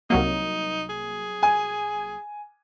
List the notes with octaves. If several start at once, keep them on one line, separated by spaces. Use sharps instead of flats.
C2 F#3 A#3 D#4
G#4
G#5